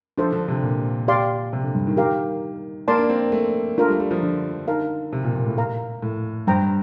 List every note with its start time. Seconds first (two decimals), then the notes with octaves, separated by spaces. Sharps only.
0.18 F3 D4 A4 C5
0.32 D3
0.48 C3
0.63 A#2
1.08 G4 D5 F5 C6
1.53 C3
1.64 D3
1.75 G2
1.87 D#3
1.97 G4 A#4 F5
2.88 A#3 A#4 D5 A5 C6
2.98 D4
3.10 C4
3.32 A3
3.78 A3 D4 F4 A#4
3.88 G3
4.00 G3
4.11 F3
4.23 D3
4.68 D#4 A#4 F5 A5
5.13 C3
5.24 A#2
5.35 A#2
5.46 A2
5.58 A#4 F5 A#5
6.02 A2
6.47 G2 C5 G5 A#5